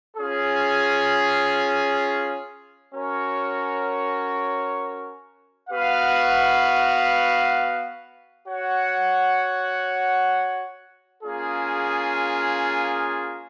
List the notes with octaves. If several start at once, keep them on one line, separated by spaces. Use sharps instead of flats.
C#4 F4 G#4
C#4 F#4 A#4 C#5
B3 F#4 B4 F5
F#4 C#5 F#5
A#3 C#4 F4 G#4